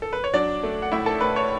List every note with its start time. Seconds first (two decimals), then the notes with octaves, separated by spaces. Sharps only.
0.02 A4
0.13 B4
0.24 C#5
0.34 F#3 D4 D5
0.63 A3
0.82 F#5
0.92 A2 E4 E5
1.06 A4 A5
1.21 A2 B4 B5
1.36 C#5 C#6